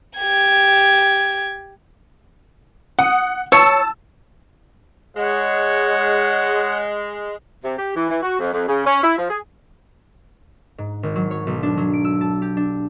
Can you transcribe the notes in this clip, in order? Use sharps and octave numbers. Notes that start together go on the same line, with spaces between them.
G4 G#6
F#5 D#6
C#5 A5 E6
G#3 C#5 F#5
C3
G4
E3
E3
F#4
F2
F2
C#3
C#4
E4
F3
G#4
G#2
G#1
F#3
C#5
B1
D4
F#3
D7
E6
A5
G4
D4